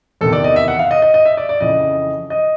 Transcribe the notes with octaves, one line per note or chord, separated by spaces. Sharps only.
E2 C3 D#3 A4
D5
D#5
E5
F#5
F5
D#5
D#5
D#5
E5
D5
D5
F2 C#3 E3 D#5
D#5